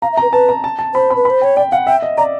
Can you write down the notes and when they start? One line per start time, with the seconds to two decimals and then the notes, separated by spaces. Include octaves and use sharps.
0.02 F5 A#5
0.13 E5
0.17 B4 A#5
0.33 B4 A5
0.49 A#5
0.64 A5
0.79 A5
0.94 C5 B5
1.10 B5
1.16 B4
1.25 C5 B5
1.41 C#5 G5
1.56 D5 G5
1.72 F5 F#5
1.87 E5 G5
2.02 D#5
2.18 D5 A#5